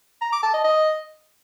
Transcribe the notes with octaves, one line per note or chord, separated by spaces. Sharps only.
A#5
D6
A5
D#5
D#5